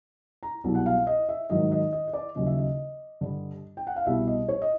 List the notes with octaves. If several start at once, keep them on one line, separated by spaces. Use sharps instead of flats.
A#5
C2 B2 F#3
F#5
F5
D#5
E5
G#2 D#3 F#3 D#5
D#5
D#5
D#5
D5
D#2 C#3 F#3 D#5
E5
D#5
G2 D3 G3
G5
F#5
F5
C2 B2 G3 E5
D#5
C#5
D#5